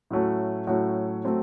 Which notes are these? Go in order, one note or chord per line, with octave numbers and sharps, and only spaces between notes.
A2 F#3 A3 C#4 F#4
A2 F#3 A3 C#4 F#4
F#3 A3 C4